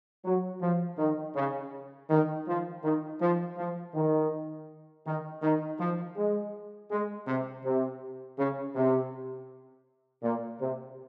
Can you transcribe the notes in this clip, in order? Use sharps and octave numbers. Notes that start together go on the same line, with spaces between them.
F#3
F3
D#3
C#3
D#3
F3
D#3
F3
F3
D#3
D#3
D#3
F3
G#3
G#3
C3
C3
C#3
C3
A#2
C3